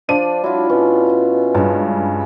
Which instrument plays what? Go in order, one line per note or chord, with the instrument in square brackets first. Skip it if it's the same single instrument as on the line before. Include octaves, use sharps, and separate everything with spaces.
[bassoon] F3 [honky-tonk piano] D4 D#7
[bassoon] F#3 [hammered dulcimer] E4 F4
[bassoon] B2 [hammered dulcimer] C#4
[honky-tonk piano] G2 [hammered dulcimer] C#3 G#3